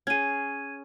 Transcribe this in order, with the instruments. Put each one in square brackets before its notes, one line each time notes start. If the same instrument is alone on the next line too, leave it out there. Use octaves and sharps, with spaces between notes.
[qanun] C#4 G#4 [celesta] G#6 D#7